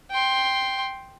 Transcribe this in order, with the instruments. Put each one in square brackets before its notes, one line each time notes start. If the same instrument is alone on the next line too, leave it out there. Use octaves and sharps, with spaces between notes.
[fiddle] G5 C6